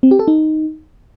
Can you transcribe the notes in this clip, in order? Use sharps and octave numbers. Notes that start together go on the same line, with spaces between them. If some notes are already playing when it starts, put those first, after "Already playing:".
C4
G4
A4
D#4